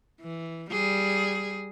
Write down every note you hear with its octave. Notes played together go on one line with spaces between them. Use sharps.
E3
G3 G#4